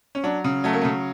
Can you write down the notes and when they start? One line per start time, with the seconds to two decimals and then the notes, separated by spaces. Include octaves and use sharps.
0.15 C#4
0.23 F#3 D4
0.44 C#3
0.64 F#3 A3
0.73 A#3
0.81 A3
0.85 C#3